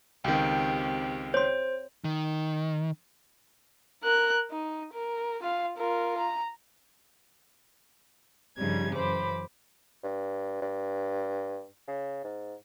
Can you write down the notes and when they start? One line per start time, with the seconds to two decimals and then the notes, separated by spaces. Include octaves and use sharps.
0.24 C#2 D#3 C4 G4 G5
1.34 C5 C#5 C6
2.04 D#3
4.03 A#4 F#6
4.51 D#4
4.93 A#4
5.43 F4 F5
5.77 F4 A#4
6.18 A#5
8.58 G2 C#3 F3 G3 D#4 G#6
8.94 F#2 E3 C5 B5 D6
10.04 G2
10.62 G2
11.87 C#3
12.24 G#2